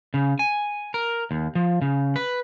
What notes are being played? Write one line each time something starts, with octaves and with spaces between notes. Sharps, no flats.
C#3
G#5
A#4
D#2
F3
C#3
B4